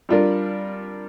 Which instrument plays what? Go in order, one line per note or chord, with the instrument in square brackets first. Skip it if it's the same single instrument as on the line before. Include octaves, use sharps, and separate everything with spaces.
[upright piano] G3 D4 F4 A#4